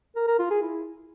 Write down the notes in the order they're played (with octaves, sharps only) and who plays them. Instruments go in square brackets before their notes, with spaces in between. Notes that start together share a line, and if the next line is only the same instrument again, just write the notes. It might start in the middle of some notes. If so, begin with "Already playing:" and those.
[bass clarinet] A#4
A#4
F4
G#4
E4